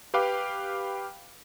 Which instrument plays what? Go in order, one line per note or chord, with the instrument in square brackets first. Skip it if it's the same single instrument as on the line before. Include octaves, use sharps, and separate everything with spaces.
[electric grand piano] G4 B4 F5 G5 D6